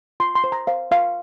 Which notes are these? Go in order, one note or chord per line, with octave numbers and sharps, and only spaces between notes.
F4 C6
C6
C5
A#5
C5 F5
F4 F5